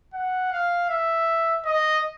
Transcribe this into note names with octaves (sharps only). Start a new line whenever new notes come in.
F#5
F5
E5
D#5